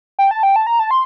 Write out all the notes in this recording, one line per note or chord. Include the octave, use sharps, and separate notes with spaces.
G5
A5
G5
A5
A#5
A5
C6